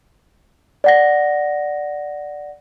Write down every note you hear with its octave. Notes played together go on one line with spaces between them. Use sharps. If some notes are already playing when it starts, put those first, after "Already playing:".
D5 F#5 A#6